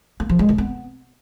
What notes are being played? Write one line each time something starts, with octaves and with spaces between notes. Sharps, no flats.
A#3
F3
G#3
D#3
B3